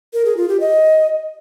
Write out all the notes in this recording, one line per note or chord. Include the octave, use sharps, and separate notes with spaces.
A#4
G#4
F4
G4
D#5